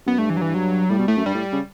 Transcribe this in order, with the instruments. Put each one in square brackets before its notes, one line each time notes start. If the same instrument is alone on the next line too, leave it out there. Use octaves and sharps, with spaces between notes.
[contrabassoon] F#2 [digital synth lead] B3
[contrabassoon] G2 [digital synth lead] A3
[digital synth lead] E3
F#3
E3
F#3
[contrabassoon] A2 [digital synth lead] G3
[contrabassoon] B2
[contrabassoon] A2 [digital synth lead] A3
[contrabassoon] F#2
[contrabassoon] G2 [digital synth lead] G3
[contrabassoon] A2
C#3